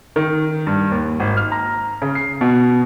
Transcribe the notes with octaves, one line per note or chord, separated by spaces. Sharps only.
D#3
G2
D#2
G#1
F6
A#5
C#3
C7
B2